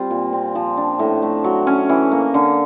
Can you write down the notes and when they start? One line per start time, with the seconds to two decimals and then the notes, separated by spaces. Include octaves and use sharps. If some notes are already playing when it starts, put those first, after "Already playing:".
Already playing: G3 C4 F4
0.11 A#2
0.33 C4
0.55 F3
0.77 D4
0.99 A2
1.22 A3
1.44 F#3
1.67 C#4
1.89 E3
2.12 A#3
2.34 D3